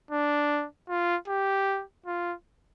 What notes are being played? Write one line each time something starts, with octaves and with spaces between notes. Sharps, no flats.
D4
F4
G4
F4